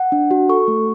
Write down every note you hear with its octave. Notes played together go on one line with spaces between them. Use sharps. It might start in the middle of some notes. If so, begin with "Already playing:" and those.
Already playing: F#5
D4
F#4
A4 C#6
A3